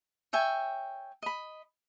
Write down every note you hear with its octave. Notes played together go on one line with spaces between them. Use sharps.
C#5 E5 G5 G#5
D#5 B5